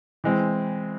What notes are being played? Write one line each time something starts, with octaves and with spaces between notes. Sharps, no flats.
E3 G#3 C4